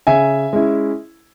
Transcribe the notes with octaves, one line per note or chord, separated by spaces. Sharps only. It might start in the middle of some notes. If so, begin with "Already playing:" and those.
C#3 E5 G#5
G#3 C#4 E4